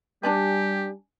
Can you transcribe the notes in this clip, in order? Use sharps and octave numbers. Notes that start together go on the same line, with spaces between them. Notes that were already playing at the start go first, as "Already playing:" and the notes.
G3 D4 G4 D5 G#5